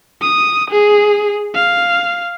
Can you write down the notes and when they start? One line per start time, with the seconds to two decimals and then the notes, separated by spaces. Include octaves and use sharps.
0.21 D#6
0.71 G#4
1.55 F5